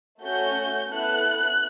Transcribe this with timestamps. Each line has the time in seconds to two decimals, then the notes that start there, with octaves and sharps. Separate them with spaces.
0.22 A3 C#4 F#4 A4 G6
0.90 B3 E4 A4 F#6